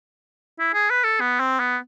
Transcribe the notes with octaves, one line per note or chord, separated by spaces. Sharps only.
E4
G#4
B4
A4
B3
C4
B3